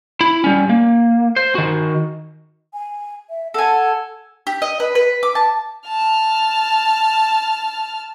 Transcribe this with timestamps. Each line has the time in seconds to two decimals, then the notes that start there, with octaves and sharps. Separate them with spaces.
0.21 E4 B5
0.44 G3 C#4
0.70 A#3
1.36 C5
1.55 D#3 F#4
2.73 G#5
3.30 E5
3.54 A4 F#5 G#5
4.47 G4
4.62 D#5
4.80 B4
4.95 B4
5.23 D6
5.35 A5
5.87 A5 F6